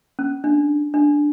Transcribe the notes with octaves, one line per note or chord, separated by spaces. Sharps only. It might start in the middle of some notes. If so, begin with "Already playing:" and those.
C#4
D4
D4